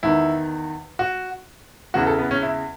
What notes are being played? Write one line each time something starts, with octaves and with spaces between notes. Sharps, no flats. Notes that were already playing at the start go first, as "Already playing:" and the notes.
E2 D#3 E4
F#4
E2 C#3 E3 F#4
A4
B3
C#4
E4